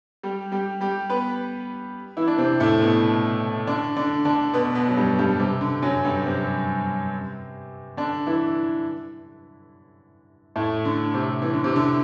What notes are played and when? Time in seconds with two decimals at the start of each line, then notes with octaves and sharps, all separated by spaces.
0.23 G3 G4
0.52 G3 G4
0.81 G3 G4
1.10 B3 B4
2.17 E3 E4
2.28 D4
2.38 C3 C4
2.60 A2 A3
2.81 B2 B3
3.67 D3 D4
3.96 D3 D4
4.25 D3 D4
4.53 B2 B3
4.75 B2 B3
4.88 F#3
4.97 G2 G3
5.19 G2 G3
5.40 C3
5.61 D3
5.82 F#2 F#3
6.04 G2 G3
6.26 C3 C4
7.97 D3 D4
8.27 E3 E4
10.56 A2 A3
10.85 D3
11.14 C3
11.42 E3
11.54 D3
11.64 C3
11.76 D3